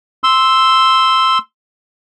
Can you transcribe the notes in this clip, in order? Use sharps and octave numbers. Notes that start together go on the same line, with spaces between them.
C6 E6